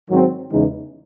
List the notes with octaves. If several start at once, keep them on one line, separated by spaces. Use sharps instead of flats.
G#2 D#3 F#3 C4
E2 C#3 E3 G#3 D#4